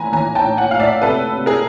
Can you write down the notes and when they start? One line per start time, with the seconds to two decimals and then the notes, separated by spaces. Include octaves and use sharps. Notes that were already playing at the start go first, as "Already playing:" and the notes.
Already playing: A2 E3 G#5 A#5 B5
0.12 E3 G#5 A#5
0.35 G5 A5
0.43 A2
0.57 F#5 G#5
0.71 A2 F5
0.80 D5 E5
1.02 C3 A4 B4
1.33 C3
1.46 G#4 A#4